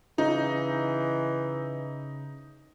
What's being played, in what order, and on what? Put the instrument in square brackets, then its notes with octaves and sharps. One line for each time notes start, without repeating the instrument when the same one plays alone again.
[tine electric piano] C#3 [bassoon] E3 [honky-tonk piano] D#4